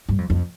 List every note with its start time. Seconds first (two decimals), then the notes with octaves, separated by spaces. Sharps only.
0.09 G2
0.18 F2
0.30 F2